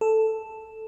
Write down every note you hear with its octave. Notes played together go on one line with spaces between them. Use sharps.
A4